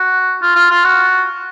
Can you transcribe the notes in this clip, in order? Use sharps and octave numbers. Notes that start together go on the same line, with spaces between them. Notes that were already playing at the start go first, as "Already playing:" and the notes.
Already playing: F#4
F4
F4
F4
F#4